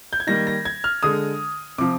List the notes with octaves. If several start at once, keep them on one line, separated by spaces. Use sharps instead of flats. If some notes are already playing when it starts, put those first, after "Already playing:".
G6
G#6
D#3 G3 A#3 A#6
A#6
G#6
F6
D3 G#3 D#6
C3 F3 D6